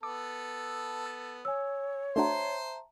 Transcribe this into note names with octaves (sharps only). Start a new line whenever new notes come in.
B3 A4 D6
C#5 G#5 E6
A3 D4 F#4 C5 E5 A5 A#5 C6